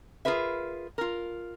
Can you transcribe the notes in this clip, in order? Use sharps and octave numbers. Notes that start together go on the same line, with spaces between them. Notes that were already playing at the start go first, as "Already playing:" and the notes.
F4 G#4 A#4 B4 E5
F4 A#4